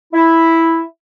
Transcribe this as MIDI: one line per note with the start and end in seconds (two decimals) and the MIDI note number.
0.14 0.81 64